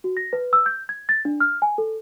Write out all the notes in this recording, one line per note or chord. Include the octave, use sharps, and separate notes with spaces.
F#4
A#6
B4
E6
G6
G#6
A6
D4
F6
G#5
A4